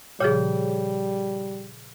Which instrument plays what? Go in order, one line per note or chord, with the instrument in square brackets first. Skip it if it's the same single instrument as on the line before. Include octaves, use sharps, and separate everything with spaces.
[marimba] A#2 C#3 F3 [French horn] G3 [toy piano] G#4 C#5